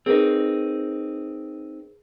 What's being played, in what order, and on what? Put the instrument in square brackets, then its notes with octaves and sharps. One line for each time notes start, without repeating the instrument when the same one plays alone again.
[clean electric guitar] C4 D#4 [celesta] G#4 A#4 B4